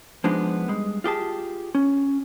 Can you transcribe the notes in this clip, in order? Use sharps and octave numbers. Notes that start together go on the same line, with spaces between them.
F3 G#3 B3 D4 D#4
G3 G#3
F4 G4 G#4 A5
C#4